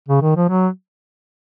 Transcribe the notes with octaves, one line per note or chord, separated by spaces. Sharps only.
C#3
D#3
F3
F#3